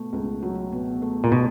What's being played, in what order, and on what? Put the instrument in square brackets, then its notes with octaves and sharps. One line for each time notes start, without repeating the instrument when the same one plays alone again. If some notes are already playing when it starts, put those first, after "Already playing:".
Already playing: [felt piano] B2 A3
C#2
F#3
B2
A3
[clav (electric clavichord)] A#2
B2